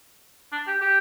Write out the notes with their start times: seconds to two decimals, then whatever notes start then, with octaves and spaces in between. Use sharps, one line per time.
0.52 D4
0.68 G4
0.82 G4